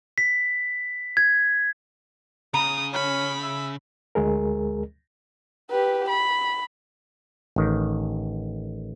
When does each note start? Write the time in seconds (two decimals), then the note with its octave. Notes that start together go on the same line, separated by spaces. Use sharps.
0.18 B6
1.17 G#6
2.54 C#3 A#5 D#6
2.93 C#4 B5
3.42 E5
4.15 D2 G#3 G#4 A#4
5.70 G4 B4
6.09 B5
7.56 A1 D#3